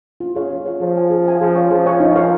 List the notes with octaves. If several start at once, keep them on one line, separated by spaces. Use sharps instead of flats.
F4
G#4 C#5 F5
F4
G#4 C#5 F5
F3 G#4
F5 G#5
G#4
F5 G#5
F3 G#4
C#5 G#5 C#6
F3 G#4
C#5 G#5 C#6
D#4
A#4 F5 G#5 C#6